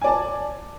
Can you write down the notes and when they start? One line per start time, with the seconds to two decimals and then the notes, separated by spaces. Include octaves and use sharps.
0.01 G#5
0.04 D5
0.07 A5